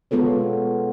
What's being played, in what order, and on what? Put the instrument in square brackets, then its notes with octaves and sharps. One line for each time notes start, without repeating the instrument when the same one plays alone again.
[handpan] G#3 B3 F4 A4 C#5